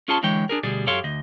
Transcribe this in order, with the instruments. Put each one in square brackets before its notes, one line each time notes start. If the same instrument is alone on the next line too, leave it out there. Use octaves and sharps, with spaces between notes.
[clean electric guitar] C#4 F4 G#4 C#5 A5 C6
D3 E3 G#3 C#5 G5
D4 G#4 A#4
D2 B2 G3 G#4 D5
F#2 G4 A4 C#5 F5 C6
D2 D#5